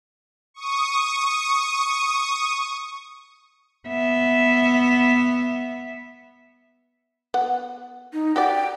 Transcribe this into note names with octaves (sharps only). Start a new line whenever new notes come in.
C#6 D#6
B3 E5
B3 F#5
D#4
F#4 G4 D5 G5